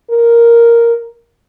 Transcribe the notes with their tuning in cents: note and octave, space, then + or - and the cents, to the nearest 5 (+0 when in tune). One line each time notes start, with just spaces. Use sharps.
A#4 +0